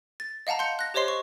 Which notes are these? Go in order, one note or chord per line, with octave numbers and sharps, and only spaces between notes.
A6
D#5 F5 F#5 A5 A#5
C6 G6 C#7
F#6 A#6
G4 C5 C#5 D#5 C6 C7
C#6